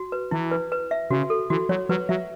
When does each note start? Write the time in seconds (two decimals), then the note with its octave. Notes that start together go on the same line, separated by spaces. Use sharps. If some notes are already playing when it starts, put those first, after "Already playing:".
Already playing: F#4
0.12 B4
0.31 E3 E4
0.52 B4
0.72 B4
0.91 E5
1.10 C#3 F#4
1.30 A4
1.50 E3 F#4
1.69 F#3 C#5
1.89 F#3 B4
2.09 F#3 E5